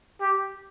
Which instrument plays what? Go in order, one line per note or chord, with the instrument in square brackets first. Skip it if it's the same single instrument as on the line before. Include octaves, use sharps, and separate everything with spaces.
[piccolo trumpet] G4